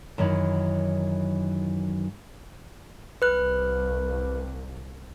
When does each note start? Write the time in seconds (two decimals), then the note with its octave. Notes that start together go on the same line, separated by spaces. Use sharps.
0.18 F#2 D#3 E3 F#3
3.22 C2 B4 F#6